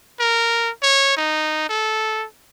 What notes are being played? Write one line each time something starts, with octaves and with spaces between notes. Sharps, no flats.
A#4
C#5
D#4
A4